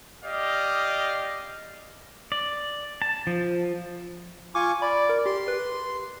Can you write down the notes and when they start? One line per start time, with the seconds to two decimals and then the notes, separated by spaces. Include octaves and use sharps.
0.25 G4 D5 D#5 F5
2.32 D5
3.02 A5
3.27 F3
4.55 F4 G#5 C#6 D6
4.82 D5 B5
5.09 A#4
5.26 G4 C6
5.48 B4